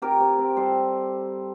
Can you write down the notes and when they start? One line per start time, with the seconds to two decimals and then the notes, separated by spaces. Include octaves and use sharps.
0.02 C3 G4 A#4
0.20 C3
0.39 C4
0.57 G3 A4 C5